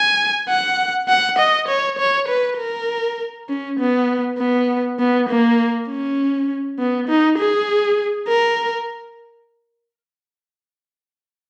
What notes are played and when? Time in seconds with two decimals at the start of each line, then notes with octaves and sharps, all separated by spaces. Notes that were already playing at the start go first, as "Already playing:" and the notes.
Already playing: G#5
0.49 F#5
1.09 F#5
1.39 D#5
1.68 C#5
1.99 C#5
2.29 B4
2.58 A#4
3.49 C#4
3.79 B3
4.38 B3
4.99 B3
5.29 A#3
5.89 C#4
6.79 B3
7.09 D#4
7.38 G#4
8.28 A#4